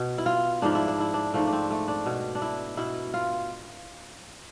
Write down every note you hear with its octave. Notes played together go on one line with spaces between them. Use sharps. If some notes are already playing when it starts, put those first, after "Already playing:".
Already playing: B2
E4
F4
G#2 F3 D4
E4
D4
E4
D4
G#2 F3 A3
D4
C4
A3
D4
B2
D4
E4
B2 E4
F4